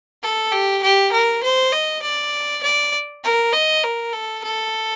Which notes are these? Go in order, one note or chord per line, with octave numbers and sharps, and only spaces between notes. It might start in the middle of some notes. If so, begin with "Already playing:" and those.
A4
G4
G4
A#4
C5
D#5
D5
D5
A#4
D#5
A#4
A4
A4